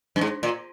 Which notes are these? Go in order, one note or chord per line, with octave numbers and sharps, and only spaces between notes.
G2
G#2
A#2